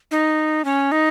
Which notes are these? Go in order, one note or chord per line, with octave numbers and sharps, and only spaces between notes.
D#4
C#4
D#4